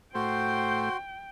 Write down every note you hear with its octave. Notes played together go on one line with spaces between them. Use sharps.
A2 A3 F#4 C5 G5 C6